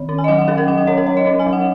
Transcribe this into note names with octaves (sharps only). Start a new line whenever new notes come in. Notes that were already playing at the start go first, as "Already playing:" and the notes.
Already playing: D#3
C#4
G#5
D#5
F#3 F#5
F#5
C#4 G#4
A#4
F#3 F#5
F#5
C#4 C#5
A#4
F#3 C#5
D#5
C#4
G#5
F#3
F#5